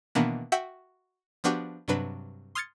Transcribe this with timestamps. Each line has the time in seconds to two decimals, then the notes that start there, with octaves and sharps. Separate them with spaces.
0.15 B2 D#3 E3 A#3 B3 D4
0.52 F#4 E5 F#5 G5
1.44 F3 B3 D4 F#4 G4
1.88 G2 C3 F#3 D4 B4
2.55 C6 D#6 F6 G#6 A6 C#7